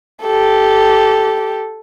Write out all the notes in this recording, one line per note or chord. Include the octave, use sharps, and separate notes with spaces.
G4 A4